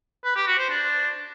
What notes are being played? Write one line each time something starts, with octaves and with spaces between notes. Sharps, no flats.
B4
G4
F#4
C5
D4